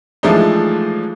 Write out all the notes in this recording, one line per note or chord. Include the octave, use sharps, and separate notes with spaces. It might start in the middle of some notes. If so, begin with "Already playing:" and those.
E3 F3 G#3 A3 D4 D#4